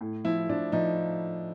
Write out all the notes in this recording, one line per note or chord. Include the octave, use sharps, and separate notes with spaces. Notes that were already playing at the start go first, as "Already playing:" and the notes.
A2
F3 E4
F3 D4
F3 D#4